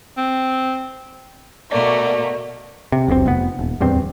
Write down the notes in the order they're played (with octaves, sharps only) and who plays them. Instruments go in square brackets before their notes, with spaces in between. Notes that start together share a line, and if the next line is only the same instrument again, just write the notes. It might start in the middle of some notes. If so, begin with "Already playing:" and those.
[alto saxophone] C4
[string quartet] B2 A3 A#3 [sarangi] D5
[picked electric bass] C3
E1 B1 A#2 C4
F1 B3
D#1
D1 E2 G2 C4